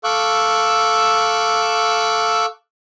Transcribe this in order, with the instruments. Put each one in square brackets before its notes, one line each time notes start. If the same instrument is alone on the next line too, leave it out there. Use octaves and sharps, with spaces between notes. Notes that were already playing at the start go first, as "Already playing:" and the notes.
[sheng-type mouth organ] A4 F5 C#6 D6 E6 F#6